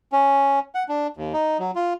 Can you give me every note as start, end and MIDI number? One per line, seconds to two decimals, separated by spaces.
0.12 0.59 61
0.75 0.83 78
0.89 1.07 62
1.17 1.33 39
1.33 1.57 63
1.59 1.71 54
1.76 1.93 65